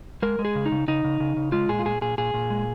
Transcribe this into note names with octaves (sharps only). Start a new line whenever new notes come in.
G#3 A#4
G#3
G#4
C#3
D#4
C#3
C#3 D#4
C#3
C#3
C#3
G#3 F4
A#2 G#4
F4
A#2 G#4
A#2 G#4
A#2 G#4
A#2
G#3